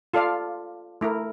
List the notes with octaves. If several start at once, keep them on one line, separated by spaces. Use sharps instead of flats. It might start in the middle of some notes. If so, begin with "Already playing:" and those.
F4 A4 D5 F5
A3 E4 A#4